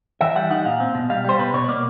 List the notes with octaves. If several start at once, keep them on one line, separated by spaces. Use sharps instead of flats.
E3 E5
G3 F#5
D#4 F#5
A#2 F5
C4
B2
G3 F5
G3 C5
B2 B4
B2 C#5
A#3 D5